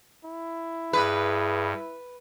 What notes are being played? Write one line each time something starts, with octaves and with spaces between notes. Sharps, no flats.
E4
G2 G#4 B4